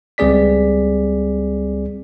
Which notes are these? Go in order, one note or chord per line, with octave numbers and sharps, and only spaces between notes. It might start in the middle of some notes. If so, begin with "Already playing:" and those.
C#2 G3 C4 G#4 D5 B6